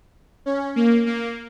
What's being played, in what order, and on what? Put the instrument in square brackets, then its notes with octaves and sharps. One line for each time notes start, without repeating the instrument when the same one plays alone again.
[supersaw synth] C#4
A#3
A#3